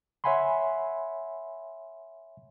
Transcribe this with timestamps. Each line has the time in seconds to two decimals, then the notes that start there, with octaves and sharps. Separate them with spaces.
0.24 C#5 E5 F#5 G#5 B5 C6